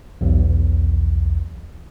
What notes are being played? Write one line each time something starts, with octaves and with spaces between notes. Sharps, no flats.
B1 E2